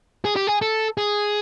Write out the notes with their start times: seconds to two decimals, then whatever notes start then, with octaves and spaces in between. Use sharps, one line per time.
0.25 G#4
0.36 G4
0.47 G#4
0.62 A4
0.98 G#4